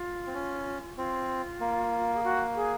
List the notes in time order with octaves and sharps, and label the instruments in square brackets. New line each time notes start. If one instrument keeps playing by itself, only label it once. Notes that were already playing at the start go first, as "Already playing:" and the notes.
Already playing: [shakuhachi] F4
[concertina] C4
C#4
[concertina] C4 [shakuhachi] F4
[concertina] A#3
[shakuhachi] G#4
F#4
G#4